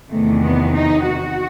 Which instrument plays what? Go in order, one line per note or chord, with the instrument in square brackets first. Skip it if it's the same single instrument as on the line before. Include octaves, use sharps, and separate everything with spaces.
[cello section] E2 C3 D#3 A3
B3
D#4
F#4